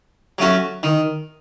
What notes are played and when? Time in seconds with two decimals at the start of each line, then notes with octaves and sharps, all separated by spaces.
0.38 F#3 A3 C#4 F#4
0.83 D#3